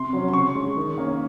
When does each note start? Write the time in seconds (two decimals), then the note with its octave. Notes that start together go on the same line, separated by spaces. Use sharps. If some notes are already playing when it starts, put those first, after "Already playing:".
Already playing: C3 C6
0.13 F#3 C#4
0.28 C6
0.33 C#3 C#6
0.55 G#3 C#4
0.77 D#3
0.98 A#3 C#4